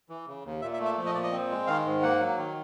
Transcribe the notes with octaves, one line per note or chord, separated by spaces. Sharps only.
E3
C#3
D#2
A#2 E5
E5
A3
E5
F3
D#5
A#2 D5
D#5
C4
G#3
D#3 F5
G#2
A#3 F#5
F#3
D#3